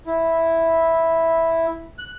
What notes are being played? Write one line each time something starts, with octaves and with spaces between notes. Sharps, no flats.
E4
F#6